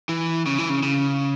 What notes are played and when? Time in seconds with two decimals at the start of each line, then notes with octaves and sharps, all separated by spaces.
0.09 E3
0.46 C#3
0.58 E3
0.70 C#3
0.83 C#3